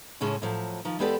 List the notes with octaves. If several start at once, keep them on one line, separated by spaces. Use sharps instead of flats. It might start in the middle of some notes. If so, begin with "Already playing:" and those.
A2 C#3 G#3 C#4 A5
A2 F3 F#3
D#3 F3
E2 G#3 B3 G4 A4 D5